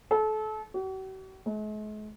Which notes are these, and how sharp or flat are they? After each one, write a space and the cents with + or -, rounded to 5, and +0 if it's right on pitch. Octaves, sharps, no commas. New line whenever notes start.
A4 -30
F#4 +45
G#3 +45